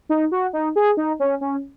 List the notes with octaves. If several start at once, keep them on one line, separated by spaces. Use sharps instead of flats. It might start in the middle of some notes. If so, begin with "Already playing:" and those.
D#4
F#4
D#4
G#4
D#4
C#4
C#4